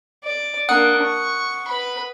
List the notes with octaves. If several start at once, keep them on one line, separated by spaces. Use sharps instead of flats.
D5
A#3 D4 F#5 D#6 F#6
C#6
B4 B5